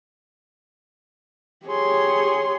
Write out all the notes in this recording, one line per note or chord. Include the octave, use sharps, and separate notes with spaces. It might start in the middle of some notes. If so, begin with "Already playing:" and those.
G4 G#4 C#5 C6